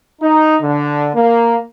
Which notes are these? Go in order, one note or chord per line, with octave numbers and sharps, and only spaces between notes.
D#4
D3
A#3